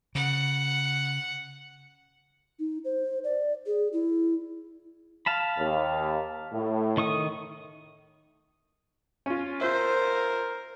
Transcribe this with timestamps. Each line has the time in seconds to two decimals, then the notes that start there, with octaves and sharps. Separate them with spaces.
0.15 C#3 F#5
2.59 D#4
2.85 C5
3.24 D5
3.66 G#4
3.93 E4
5.26 F5 A5 B5
5.59 D#2
6.53 A2
6.97 D#3 C#6 D#6
9.26 C#4 F4
9.61 F4 A#4 C5 E5